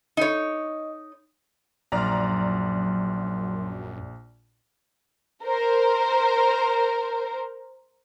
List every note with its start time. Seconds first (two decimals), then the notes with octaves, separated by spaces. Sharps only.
0.17 D#4 C#5 D#5
1.92 A#1 F#2 F#3 D5 A#5 C6 F6
5.43 A#4 C5